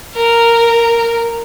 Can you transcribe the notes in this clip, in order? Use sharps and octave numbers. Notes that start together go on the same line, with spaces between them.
A#4